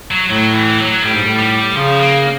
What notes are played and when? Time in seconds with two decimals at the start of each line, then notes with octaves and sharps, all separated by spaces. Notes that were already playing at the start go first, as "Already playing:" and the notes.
0.11 F#3
0.29 A2 F#3
0.54 E3
0.78 F#3
1.03 A2 G3
1.12 G#2
1.22 A2
1.38 G3
1.75 C#3 F3
1.99 A#3